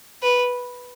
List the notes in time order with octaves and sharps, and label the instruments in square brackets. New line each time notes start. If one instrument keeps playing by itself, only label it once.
[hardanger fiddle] B4